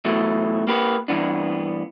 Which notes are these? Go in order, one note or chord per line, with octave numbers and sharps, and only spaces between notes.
B2 E3 F#3 A3
A#3 G4 B4
G2 E3 B3 D4